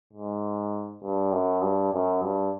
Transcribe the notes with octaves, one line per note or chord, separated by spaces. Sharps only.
G#2
G2
F#2
G2
F#2
G2